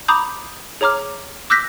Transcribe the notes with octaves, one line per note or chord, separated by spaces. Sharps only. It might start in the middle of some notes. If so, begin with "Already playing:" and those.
A#5 B5 D6 D#6 G6
G#4 C#5 A#5 D6 F6
D6 E6 F#6 G6 A#6 B6